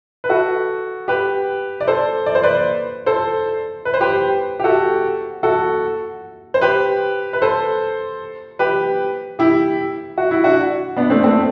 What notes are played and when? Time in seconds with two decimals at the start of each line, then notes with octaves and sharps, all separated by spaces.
0.24 B4
0.29 F#4 A4
1.08 G4 B4
1.80 D5
1.87 A4 C5
2.26 D5
2.35 C5
2.43 B4 D5
3.06 A4 C5
3.85 B4
3.94 C5
4.01 G4 B4
4.60 G4
4.64 F#4 A4
5.43 F#4 A4
6.54 C5
6.61 G4 B4
7.33 B4
7.42 A4 C5
8.59 G4 B4
9.39 E4 G4
10.18 F#4
10.31 E4
10.43 D4 F#4
10.97 B3 D4
11.10 A3 C4
11.24 A3 C4